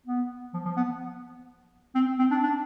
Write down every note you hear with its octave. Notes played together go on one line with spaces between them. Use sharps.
B3
F3
F3
B3
C4
C4
D4
D4